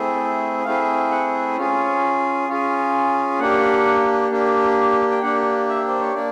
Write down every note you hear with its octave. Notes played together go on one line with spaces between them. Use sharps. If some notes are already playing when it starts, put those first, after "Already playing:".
Already playing: A3 C4 E4 G#4
A3 C4 E4 G#4 F5
F#5
C#4 F4 G#4
C#4 F4 G#4
A#3 D4 G4 F#5
A#3 D4 G4
G5
A#3 D4 G4 F#5
E5
C5
C#5
A#3 D4 D5